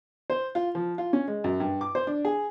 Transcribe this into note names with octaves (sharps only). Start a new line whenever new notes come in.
C5
F4
F3
F4
C#4
G#3
F#2
G2
D6
C5
D4
G#4